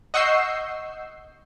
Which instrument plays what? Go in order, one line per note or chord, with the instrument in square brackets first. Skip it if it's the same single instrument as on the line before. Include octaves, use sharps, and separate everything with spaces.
[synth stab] D#5 F#5 C#6 E6 G6 C7